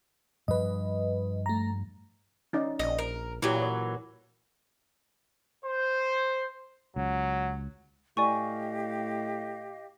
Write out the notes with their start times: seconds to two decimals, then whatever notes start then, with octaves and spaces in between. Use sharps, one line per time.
0.48 G2 F3 G3 B4 D#5
1.46 A3 A#5
2.53 C#4 D#4 D5
2.79 A#1 D#5
2.99 A#4
3.42 A#2 E3 F#3 E4 G4
3.62 C#5
5.65 C5
6.96 C#2 F#3
8.17 A2 G4 D5 D#5 F5 G#5 C#6